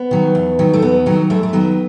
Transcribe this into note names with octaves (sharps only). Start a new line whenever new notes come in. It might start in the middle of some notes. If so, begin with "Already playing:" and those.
Already playing: B3
D#3 F#3
E2
D#3 F#3
A3
E2 B3
D#3 F#3
F#2 A3
A3
D#3 F#3 B3